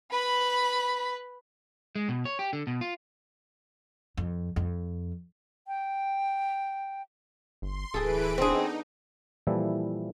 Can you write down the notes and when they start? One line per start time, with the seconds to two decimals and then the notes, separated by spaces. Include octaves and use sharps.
0.12 B4 B5
1.95 G#3
2.09 B2
2.25 C#5
2.39 G4
2.53 D3
2.67 B2
2.81 F4
4.17 F2
4.56 F2
5.68 G5
7.62 G1 C6
7.94 D1 E3 G#4 A4 B4 D7
8.38 B3 C4 D4 D#4 G#4
9.47 A#2 E3 F3 G3 E4 A4